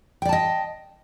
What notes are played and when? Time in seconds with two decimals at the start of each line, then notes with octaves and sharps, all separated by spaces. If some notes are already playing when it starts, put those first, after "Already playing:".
0.22 G5
0.25 D5
0.29 A5
0.33 D#5